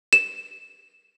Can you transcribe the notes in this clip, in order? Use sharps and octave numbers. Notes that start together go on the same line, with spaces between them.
E7